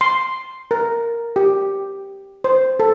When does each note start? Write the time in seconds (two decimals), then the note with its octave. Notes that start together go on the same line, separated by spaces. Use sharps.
0.01 C6
0.71 A#4
1.36 G4
2.44 C5
2.80 A4